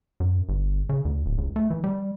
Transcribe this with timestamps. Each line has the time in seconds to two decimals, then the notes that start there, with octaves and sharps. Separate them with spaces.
0.20 F#2
0.49 G1
0.89 C#3
1.05 D2
1.26 D1
1.38 C#2
1.56 A3
1.70 E3
1.84 G3